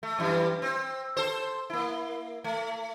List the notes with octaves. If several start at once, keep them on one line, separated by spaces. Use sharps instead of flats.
A3
F#2 E3 G3
C4
A4 C5
A#3 E4
A3